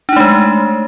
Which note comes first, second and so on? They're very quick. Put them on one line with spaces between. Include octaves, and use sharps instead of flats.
D4 D#4 A3 G#3